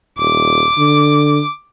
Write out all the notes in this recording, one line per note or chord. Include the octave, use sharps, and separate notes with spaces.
D#1 D6
D3